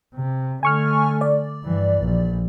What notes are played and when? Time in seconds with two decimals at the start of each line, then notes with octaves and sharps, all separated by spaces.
0.15 C3
0.63 D3 A3 G#5 C#6 F6
1.21 D5
1.63 G2 E3
2.00 A#1